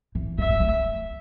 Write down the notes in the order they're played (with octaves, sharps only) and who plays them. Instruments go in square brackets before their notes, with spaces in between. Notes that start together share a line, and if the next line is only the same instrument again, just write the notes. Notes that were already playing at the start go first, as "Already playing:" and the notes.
[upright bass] E3
[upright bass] G3 [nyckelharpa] E5
[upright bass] G#3
A3